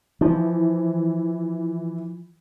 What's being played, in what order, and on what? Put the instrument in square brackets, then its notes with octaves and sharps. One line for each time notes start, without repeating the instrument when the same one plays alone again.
[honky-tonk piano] E3 [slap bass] F3